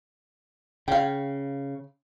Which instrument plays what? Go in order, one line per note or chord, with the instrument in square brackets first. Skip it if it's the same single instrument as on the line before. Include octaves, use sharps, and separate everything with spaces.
[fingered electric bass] C#3 [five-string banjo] F5 G5